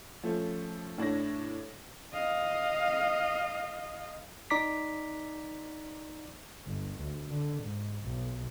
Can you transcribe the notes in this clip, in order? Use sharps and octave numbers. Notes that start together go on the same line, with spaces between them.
F3 A3 C#4
A2 D4 C#5 A#6
D#5 F5
D#4 D5 A#5 D6 B6
G1
D2
D3
G#2
B1